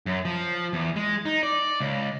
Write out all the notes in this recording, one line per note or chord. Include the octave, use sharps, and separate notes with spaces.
F#2
F3
E2
G#3
D#4
D5
C#2